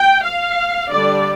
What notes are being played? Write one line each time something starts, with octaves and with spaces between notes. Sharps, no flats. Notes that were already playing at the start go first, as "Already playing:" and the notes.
Already playing: G5
F5
D3 G3 D4 D5